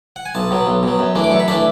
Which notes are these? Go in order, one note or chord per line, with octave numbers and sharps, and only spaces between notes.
F#5
G#5
B1 A5
B2 F#3
B1
B2 F#3
F#2
E3 A3 D4
D6
F#2 C#6
B5
E3 A3 D4 A5